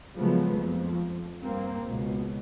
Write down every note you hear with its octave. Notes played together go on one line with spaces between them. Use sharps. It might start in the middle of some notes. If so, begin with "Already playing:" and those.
C#3 F3 F#3 G#3 A3 B3
F2 F3
G2 A#3 C4
C#2 B2